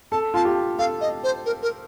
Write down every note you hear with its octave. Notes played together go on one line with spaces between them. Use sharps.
A4 A5
F4 A5
G4
A4 F5
D#5
C5
A#4
A#4